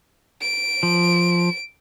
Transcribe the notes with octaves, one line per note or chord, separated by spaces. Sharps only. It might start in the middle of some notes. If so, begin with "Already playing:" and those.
D7
F3